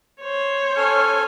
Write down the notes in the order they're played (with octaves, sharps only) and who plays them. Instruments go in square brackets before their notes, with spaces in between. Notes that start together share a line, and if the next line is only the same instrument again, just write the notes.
[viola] C5 C#5
[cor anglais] C#4 [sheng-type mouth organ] A4 G#5